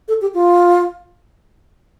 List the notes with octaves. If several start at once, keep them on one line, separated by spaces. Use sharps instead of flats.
A4
G4
F4